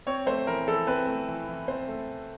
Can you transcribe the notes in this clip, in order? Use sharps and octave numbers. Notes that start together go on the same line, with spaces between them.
C4 C#5
A3 C5
E3 A#4
E3 A4
C4 B4
A3
E3
E3
C4 C5
A3